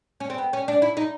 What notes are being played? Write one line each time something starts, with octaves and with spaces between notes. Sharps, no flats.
C#4
C4
B3
C#4
D4
E4
D#4